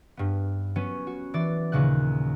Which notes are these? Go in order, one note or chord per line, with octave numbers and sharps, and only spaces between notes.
G2 B3
F#3 B3 C#4 D#7
F#4
E3 D5 A6
D#2 A#2 C#3 F#3 F#6